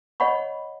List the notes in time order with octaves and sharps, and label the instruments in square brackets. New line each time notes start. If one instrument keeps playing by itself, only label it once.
[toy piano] C#5 D#5 F#5 B5 C#6